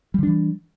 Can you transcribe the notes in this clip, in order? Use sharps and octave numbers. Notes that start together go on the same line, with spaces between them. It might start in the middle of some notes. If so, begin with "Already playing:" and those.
D3 E3 G3 D4